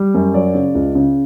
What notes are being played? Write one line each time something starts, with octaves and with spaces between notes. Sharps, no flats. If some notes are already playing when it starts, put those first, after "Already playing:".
Already playing: G3
F#2
F#3 D5
C#3
C#2
C#3